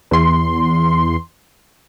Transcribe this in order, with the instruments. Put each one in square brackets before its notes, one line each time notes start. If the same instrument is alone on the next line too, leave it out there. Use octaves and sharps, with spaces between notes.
[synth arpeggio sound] E2 C6